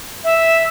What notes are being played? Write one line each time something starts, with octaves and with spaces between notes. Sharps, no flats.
E5